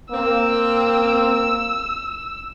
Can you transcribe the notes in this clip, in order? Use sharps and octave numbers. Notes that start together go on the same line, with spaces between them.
A#3 C4 E6